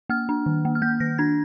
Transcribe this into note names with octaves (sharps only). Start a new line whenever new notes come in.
A#3 F6
D4
D#3
A#3
F6
A#3 G6
D#3 A#6
D4 G#6